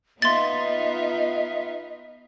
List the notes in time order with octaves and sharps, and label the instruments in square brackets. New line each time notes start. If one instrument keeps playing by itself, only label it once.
[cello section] B3 D#4 F4 [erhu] D#5 [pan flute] E5 [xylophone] C6 A6